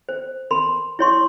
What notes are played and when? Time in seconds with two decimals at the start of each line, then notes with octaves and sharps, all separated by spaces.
0.09 C5
0.51 A#4 B5 C6
0.99 E4 C#5 C6 C#6